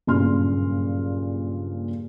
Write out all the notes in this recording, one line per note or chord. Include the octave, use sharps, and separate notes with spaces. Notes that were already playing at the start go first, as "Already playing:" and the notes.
F#1 G2 A#2 C#3 C6 F6